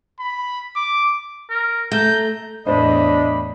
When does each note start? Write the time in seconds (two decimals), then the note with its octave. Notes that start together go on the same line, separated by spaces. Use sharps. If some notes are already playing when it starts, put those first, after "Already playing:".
0.20 B5
0.76 D6
1.50 A#4
1.92 A3 A#5 G6
2.67 E2 A2 D4 C5 D#5 B5